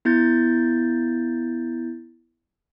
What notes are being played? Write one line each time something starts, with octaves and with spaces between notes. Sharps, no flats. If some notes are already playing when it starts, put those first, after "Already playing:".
B3 E4 G6 A6